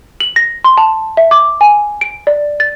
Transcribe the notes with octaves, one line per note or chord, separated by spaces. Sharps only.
F#7
A#6
C6
A5
E5
D6
G#5
D7
D5
A6